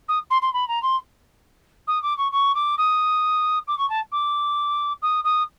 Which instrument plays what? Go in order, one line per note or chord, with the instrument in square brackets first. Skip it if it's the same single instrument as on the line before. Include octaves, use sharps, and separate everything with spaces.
[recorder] D#6
C6
C6
B5
A#5
C6
D#6
D6
C#6
C#6
D6
D#6
D6
C#6
A5
D6
D#6
D#6